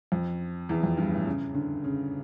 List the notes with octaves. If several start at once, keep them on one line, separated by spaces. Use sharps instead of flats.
F2
E2
F2
G2
A2
C#3
D3
C#3